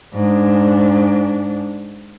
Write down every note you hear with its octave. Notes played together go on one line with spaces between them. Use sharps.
G#2 D4